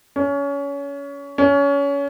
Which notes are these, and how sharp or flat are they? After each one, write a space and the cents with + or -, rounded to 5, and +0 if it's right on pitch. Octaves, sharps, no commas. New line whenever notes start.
C#4 +25
C#4 +25